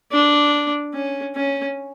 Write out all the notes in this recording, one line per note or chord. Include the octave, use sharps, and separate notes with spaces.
D4
C#4
C#4